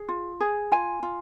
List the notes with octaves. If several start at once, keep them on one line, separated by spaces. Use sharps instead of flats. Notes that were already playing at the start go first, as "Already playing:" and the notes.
Already playing: G#4
F4
G#4
F4 G#5
F4